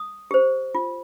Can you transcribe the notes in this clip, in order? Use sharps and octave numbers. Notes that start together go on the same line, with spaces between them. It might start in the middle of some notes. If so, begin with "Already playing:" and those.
Already playing: D#6
G4 C5
F4